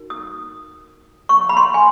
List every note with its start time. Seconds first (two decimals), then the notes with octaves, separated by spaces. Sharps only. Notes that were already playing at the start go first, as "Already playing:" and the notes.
Already playing: D#4 F#4 A#4
0.10 D#6
1.29 C#6
1.49 B5
1.57 C6
1.74 G#5